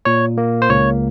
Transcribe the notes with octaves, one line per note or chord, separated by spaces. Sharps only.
A#2 C#5
A#3
C5
C#2 C#5